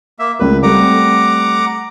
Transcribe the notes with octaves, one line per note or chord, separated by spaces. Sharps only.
A#3 E5
C#2 A#4 B4
G3 A3 C4 F#5 A#5 D6